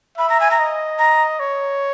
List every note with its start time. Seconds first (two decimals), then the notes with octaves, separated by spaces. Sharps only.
0.18 E5 B5
0.30 A#5
0.40 G#5
0.51 A#5
0.59 D#5
0.99 A#5
1.39 C#5